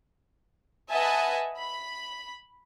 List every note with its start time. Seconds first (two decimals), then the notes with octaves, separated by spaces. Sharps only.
0.90 B4 D#5 E5 F#5 G#5 A5
1.57 B5